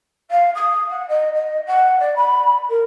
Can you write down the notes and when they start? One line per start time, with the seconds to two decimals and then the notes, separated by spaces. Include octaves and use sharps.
0.30 F5
0.54 D#6
0.90 F#5
1.08 D#5
1.33 D#5
1.66 F#5
1.99 D5
2.16 B5
2.69 A#4